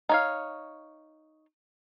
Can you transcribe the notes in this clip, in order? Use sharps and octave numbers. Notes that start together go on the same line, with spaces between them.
D#4 C#5 F5